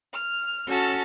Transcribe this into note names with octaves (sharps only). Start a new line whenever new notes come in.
F6
C#4 F#4 A4 A5 E6 F6